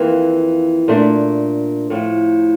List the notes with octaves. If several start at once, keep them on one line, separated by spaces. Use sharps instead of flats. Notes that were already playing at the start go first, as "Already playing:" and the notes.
Already playing: F2 E3 A#3
A#2 A3 D4
A2 F3 A3